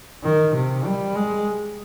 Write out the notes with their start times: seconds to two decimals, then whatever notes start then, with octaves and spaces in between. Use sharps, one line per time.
0.24 D#3
0.55 C3
0.85 G3
1.15 G#3